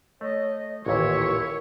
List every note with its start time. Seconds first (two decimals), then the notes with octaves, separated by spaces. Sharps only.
0.21 A3 C#5 D#5
0.86 A1 D#2 A#2 E4 A#4 C#5